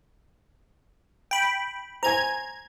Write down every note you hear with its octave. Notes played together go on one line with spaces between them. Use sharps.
G5 B5
C5 G#5 A#5 G#6